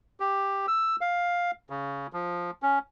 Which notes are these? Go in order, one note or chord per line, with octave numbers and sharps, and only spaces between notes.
G4
E6
F5
C#3
F3
C#4